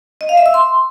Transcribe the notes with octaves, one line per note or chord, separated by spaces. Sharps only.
D#5
F5
E5
E6
C6